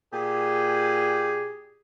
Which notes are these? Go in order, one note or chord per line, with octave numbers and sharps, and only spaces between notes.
A#2 G4 G#4